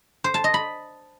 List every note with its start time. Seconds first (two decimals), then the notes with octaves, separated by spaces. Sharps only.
0.24 C5
0.34 A5
0.44 D#5
0.54 B5